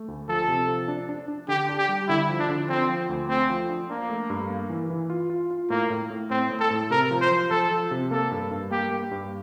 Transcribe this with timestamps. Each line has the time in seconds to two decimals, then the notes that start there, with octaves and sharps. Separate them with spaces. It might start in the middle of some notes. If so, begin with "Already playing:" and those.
Already playing: A3
0.08 D2
0.29 F3 A4
0.48 C3
0.68 F3
0.88 D4
1.09 D4
1.28 D4
1.48 D3 G4
1.69 D4
1.78 G4
1.89 G3
2.08 D3 E4
2.29 F3
2.39 D4
2.49 D3
2.69 F3 C4
2.89 F3
3.09 D2
3.29 A3 C4
3.50 F3
3.69 D4
3.90 A#3 D4
4.10 A3
4.30 G2
4.50 A#3
4.69 E3
4.90 E3
5.10 F4
5.30 F4
5.51 F4
5.70 A2 A#3
5.90 A2
6.10 A2
6.30 A2 C4
6.51 A2
6.60 A4
6.70 A2
6.90 C3 A#4
7.11 F3
7.21 C5
7.31 F3
7.50 F3 A4
7.71 F3
7.91 C3
8.11 A#3 A4
8.31 G2
8.51 G2
8.71 A#3 G4
8.91 A#3
9.11 G2